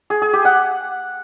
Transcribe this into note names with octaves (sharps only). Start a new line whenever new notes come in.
G#4
G#4
G4
F#5